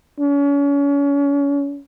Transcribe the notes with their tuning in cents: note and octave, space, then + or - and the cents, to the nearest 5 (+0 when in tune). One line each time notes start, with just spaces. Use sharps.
C#4 +35